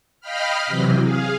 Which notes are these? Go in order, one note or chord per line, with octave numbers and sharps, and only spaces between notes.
D#5 F5 G5 B5 F6
C3 E3 F#3
G#4 F5